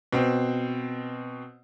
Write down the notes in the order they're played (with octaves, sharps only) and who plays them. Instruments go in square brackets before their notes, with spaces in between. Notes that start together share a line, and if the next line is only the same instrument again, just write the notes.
[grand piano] B2 C4